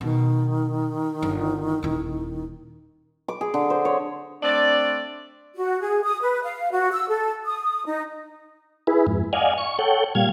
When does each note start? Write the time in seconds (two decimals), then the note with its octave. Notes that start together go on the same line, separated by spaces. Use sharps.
0.01 B2 D#3
1.22 G1
1.83 D#1 E4
3.28 D6
3.41 G#4
3.54 D3
3.70 C5
3.85 C#5
4.42 A3 C4 D4 D5
5.56 F#4
5.81 G#4
6.04 D#6
6.22 B4
6.44 F5
6.71 F#4
6.93 E6
7.09 A4
7.46 D#6
7.86 D#4
8.87 E4 G#4 B4
9.07 F2 G#2
9.33 D5 D#5 F5 F#5 G#5
9.58 C#6
9.79 A4 C#5 F#5 G5
10.15 A#2 G3 F5 G#6